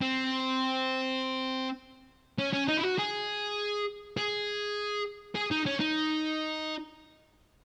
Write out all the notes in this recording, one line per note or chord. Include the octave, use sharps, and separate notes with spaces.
C4
C#4
C#4
D#4
E4
F#4
G#4
G#4
G#4
D#4
C#4
D#4